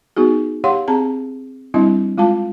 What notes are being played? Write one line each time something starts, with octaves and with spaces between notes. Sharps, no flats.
B3 D#4 F#4 G#4
G4 C#5 F5 F#5 C6
C4 G#4 A5 A#5
G3 C4 D4 E4 D#5
G#3 F4 F5 A5